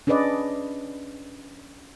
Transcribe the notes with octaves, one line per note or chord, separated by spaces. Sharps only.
C#4 D4 G#4 B4 D5 D#5